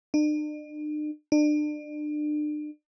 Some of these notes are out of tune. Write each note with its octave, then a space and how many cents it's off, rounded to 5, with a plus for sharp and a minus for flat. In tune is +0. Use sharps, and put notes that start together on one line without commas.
D4 +45
D4 +35